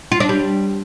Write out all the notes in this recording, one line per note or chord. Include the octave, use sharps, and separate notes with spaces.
F4
D4
G3